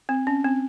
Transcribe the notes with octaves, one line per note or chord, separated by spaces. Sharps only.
C4
C#4
C4